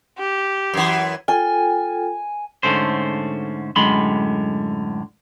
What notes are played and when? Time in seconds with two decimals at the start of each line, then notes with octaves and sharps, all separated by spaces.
0.19 G4
0.74 F#2 E3
1.28 F4 A4 G5 G#5
2.63 G#2 D3 A3 C#4 C5
3.76 F#2 A2 D3 G#3 B5 C6